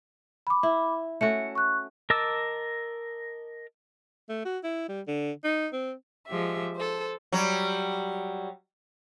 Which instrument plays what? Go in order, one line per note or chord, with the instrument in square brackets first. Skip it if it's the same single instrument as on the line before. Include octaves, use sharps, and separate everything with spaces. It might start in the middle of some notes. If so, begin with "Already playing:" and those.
[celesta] B5 D6
[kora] E4
[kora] A3 C#4 F#4 [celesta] C#7
[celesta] C#6 F#6
[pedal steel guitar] A#4 D#5 A5 D6 E6
[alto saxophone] A3
F#4
E4
G3
D3
D#4
C4
[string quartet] F3 G#3 G4 E5
A4 C5
[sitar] F#3 G3